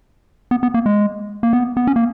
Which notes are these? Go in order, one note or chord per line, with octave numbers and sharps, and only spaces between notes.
B3
B3
A#3
G#3
A#3
B3
B3
C#4
A#3